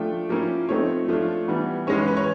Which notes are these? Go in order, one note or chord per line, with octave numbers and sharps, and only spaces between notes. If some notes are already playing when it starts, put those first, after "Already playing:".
Already playing: F3 A3 D4 F4 G5
F3 A#3 C#4 E4
F3 A3 C4 D#4 C#5
F3 A3 D4 F4
E3 G3 B3
E3 G#3 C#4 C#5
B4
B4
C#5